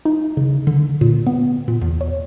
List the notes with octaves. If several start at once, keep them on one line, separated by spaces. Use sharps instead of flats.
D#4
C#3
D3
A#2
B3
A#2
E2
C#5